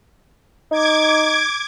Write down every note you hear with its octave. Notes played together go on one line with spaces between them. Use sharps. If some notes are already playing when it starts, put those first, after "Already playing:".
D#4 D6 G#6